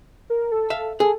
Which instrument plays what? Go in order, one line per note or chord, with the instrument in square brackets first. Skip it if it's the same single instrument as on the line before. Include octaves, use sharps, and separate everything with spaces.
[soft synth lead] A#4
A4
[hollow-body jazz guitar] E5 F5
[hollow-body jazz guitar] G#4 [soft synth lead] A4